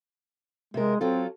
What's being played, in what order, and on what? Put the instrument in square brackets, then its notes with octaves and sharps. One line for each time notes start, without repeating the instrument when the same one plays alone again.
[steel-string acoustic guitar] C3 A#4 [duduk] G#3
[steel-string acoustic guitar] F#3 F4 A4 [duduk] C4